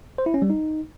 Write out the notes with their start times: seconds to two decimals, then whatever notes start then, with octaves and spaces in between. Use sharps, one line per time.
0.18 C5
0.26 E4
0.34 C#4
0.42 G3
0.50 D#4